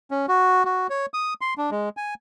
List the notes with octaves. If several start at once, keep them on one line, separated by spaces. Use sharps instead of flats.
C#4
F#4
F#4
C#5
D#6
C6
D4
G#3
G#5